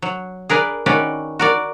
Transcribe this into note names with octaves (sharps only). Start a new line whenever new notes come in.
F#3
G#4 A#4 B4 D5
D#3 C#4 F#4 B4 D5
F#4 A#4 D5